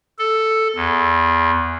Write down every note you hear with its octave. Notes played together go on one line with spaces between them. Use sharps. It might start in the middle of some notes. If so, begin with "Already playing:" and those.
A4
E2